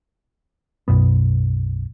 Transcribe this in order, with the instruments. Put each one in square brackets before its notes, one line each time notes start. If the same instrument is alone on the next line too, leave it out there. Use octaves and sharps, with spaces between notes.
[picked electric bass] B1 F#2 B2 B3